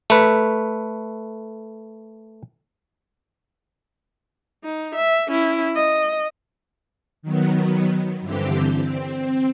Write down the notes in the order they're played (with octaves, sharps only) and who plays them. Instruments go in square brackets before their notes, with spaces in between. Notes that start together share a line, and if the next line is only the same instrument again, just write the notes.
[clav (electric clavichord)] A3 B4
[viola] D#4
E5
C#4 E4
D#5
[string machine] D#3 F#3 B3
G2 D3 E3 C4 G4
C4